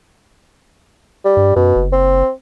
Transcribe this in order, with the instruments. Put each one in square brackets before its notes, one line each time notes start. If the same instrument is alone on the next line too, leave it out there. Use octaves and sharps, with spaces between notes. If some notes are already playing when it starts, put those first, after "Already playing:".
[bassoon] G3
[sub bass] G2
[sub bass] F#2 [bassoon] B2
[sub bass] F#1
[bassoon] C4